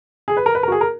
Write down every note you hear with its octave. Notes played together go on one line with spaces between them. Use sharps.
G#4
B4
A#4
B4
A#4
F#4
G#4
A#4